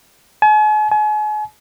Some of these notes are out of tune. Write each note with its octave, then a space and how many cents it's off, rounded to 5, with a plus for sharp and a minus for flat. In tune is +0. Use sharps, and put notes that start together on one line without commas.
G#5 +45
G#5 +40